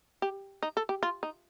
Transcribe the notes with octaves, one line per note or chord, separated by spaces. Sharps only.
G4
D#4
A4
G4
F4
D#4